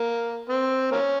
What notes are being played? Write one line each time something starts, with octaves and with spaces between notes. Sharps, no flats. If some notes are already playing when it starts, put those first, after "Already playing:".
Already playing: A#3
C4
A#3 C#4